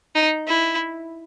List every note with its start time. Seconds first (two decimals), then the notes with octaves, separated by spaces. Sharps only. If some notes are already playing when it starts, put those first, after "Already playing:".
0.15 D#4
0.47 E4